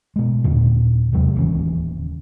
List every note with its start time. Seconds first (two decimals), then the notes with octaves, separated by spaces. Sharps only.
0.16 B2 G#3
0.44 D#2 A#2 D3
1.12 E2 C3 F#3 G#3
1.35 D1 D#2 C#3 E3